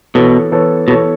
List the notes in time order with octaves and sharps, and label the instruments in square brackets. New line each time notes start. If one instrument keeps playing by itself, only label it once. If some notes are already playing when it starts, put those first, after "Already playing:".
[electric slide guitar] B2 [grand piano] E3 B3 A4 C#5
[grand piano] E3 B3 A4 C#5
[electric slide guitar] B2 [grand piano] E3 B3 A4 C#5